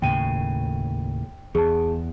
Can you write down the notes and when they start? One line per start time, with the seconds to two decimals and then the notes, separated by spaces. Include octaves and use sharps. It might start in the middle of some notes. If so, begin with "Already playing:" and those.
0.02 D#2 A2 C#3 G5 D#7
1.55 E2 G#4 A5